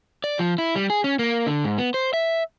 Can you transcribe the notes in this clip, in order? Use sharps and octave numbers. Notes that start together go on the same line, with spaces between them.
D5
F3
E4
G3
G#4
C#4
A#3
D3
G#2
B3
C5
E5